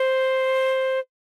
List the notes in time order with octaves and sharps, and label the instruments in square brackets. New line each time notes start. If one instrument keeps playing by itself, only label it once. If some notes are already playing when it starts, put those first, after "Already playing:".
Already playing: [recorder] C5